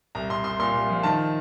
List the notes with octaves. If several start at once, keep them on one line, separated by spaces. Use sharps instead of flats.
C2 A#5
C2 C6
C2 C6
A#2 C6
C2
F3
D#3 A5